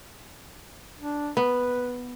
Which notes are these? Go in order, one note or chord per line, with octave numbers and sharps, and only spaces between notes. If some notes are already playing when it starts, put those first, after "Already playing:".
D4
B3 B4